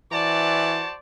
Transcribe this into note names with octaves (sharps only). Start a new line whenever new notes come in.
E3 F#4 C5 D5 A5